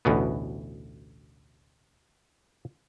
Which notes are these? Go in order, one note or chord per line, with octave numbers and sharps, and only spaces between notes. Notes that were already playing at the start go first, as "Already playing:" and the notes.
A1 D2 B2 B3